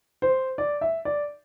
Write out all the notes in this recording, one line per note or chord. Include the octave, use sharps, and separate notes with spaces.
C5
D5
E5
D5